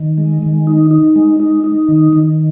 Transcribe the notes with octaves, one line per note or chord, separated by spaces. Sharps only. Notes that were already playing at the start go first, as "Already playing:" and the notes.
Already playing: D#3
G#3
D#3
D#4
D#4
G#3
D#4
D#4
D#3
D#3